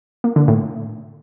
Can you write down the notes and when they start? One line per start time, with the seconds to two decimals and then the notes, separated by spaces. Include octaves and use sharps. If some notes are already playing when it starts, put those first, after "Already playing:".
0.24 A#3
0.36 D3
0.48 A2